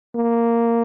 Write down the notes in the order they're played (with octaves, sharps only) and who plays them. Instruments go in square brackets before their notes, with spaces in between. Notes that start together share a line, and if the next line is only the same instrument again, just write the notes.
[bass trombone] A#3